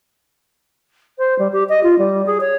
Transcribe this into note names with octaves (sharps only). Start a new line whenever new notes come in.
C5
G3
G4
D#5
F4
G3
G#4
C#5